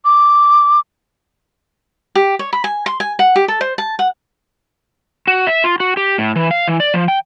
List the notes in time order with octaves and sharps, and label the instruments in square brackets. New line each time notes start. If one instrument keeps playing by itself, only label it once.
[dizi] D6
[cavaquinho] G4
C#5
B5
G#5
C6
G#5
F#5
G4
A4
C5
A5
F#5
[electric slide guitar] F#4
E5
F4
F#4
G4
A2
E3
F5
E3
D5
F3
G5